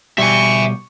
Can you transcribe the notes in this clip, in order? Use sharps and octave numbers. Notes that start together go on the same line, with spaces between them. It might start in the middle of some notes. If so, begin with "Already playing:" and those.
B2 G3 G4 E5 G#5 C#6